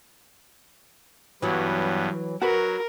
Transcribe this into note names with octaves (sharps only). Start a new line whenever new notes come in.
G2 E3 F#3 B3
F#3 F#4 A#4 B4